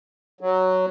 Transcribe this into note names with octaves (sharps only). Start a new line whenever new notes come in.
F#3